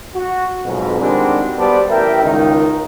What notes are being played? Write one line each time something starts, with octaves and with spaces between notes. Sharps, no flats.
F#4
B1 F2 G#2 B2
D#3 G3 G#3 C4 D4 F#4
G3 B3 A4 C5 D5
A1 A#4 E5 G5
C#2 D#3 D#4